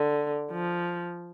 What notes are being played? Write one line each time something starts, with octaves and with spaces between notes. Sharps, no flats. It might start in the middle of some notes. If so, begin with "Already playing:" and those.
Already playing: D3
F3